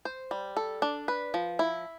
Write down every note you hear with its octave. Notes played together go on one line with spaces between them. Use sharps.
C5
G3
A4
D4
B4
F3
E4